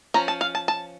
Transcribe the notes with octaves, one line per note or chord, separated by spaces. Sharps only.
F3 C#4 A#5
A5
F5
A5
A5